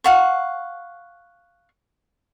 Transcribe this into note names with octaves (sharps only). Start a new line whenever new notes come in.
F5 F#5 C#6